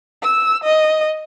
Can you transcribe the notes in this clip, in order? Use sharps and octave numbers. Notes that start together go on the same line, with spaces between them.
E6
D#5